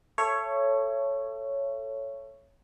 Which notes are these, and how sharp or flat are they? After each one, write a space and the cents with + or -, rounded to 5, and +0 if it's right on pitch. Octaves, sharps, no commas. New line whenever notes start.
A4 +0 C#5 +0 E5 +35